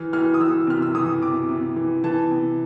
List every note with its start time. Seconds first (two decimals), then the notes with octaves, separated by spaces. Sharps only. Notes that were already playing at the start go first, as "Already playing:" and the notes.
Already playing: E3 F6
0.13 E3 F6
0.34 D#6
0.40 E3 E6
0.67 C3 F6
0.82 E6
0.95 E3 D#6
1.22 C3 D6
1.49 C3
1.76 E3
2.04 E3 A5
2.31 C3